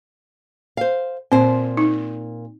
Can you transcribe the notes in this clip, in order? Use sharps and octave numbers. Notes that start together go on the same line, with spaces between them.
C5 F5
A#2 C4 C5
D#4